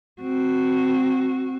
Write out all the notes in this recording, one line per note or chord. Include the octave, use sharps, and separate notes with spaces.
C4 F#4